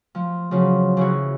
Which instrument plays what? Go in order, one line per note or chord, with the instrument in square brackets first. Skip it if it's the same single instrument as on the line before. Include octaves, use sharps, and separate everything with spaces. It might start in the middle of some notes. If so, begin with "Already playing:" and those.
[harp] F3
[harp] C#3 F3 [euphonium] F#3
[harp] C#3 E3 F#4